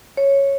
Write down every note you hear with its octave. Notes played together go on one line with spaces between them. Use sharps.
C#5